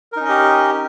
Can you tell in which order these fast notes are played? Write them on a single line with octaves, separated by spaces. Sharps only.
A#4 D#4 C#4 D#5 G4